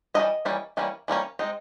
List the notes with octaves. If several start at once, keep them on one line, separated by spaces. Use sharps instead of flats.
E3 G3 A#3 C#4 D#5
E3 G3 A#3 C#4
E3 G3 A#3 C#4
E3 G3 A#3 C#4
G#3 C4 D#4